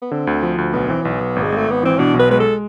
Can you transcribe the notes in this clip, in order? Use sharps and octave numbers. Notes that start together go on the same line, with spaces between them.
B3
D3 C4
D2
F3
D2
B1 B3
E3 C4
B1 B3
B1
G#1
G#3
G#1
A3
G#1 B3
E3 C4
B2 D4
B1
B4
G#3 B4
A4